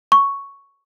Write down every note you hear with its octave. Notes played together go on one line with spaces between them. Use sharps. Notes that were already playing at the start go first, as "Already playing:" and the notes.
C#6